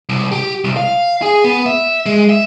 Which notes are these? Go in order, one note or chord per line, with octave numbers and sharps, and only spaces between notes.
C2
G4
C2
F5
G#4
B3
E5
G#3
E5